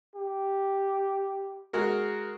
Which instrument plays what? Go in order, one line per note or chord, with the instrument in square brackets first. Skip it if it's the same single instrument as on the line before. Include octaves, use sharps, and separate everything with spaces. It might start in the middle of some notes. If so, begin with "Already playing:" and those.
[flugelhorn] G4
[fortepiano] G#3 F#4 A#4